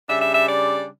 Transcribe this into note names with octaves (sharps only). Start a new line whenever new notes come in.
C#3 G3 D4 E5
E5
E5
D5